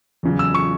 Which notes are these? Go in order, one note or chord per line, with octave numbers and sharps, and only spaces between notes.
E2 C#3 F#3
E6
C#6